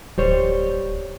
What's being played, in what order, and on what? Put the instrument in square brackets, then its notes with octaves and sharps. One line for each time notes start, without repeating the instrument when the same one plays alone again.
[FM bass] D1 [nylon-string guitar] G3 C5 C#5